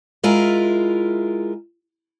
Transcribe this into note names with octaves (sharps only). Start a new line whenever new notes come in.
G#3 E4 F4 A#4